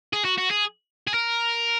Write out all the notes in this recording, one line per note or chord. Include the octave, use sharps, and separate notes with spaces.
G#4
F#4
F#4
G#4
G#4
A#4